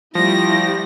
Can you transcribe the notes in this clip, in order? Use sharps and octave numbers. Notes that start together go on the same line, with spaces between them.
F3 G3 A3 E4 G4 A#6